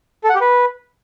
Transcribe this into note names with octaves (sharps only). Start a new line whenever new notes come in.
A4
F#5
G4
B4